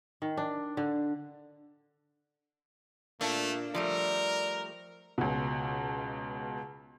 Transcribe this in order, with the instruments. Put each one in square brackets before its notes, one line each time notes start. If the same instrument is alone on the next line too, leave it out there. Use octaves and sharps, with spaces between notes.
[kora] D#3
D4
D3
[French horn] A#2 [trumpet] A3 [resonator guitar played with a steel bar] A#3 D4
[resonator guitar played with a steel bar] F3 G3 A3 [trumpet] A#4 [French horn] D5
[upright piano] C#2 B2